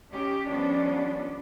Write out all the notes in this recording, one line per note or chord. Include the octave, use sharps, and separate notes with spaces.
D#3 C#4 G4
D#3 F3 G3 B3 C#4 D4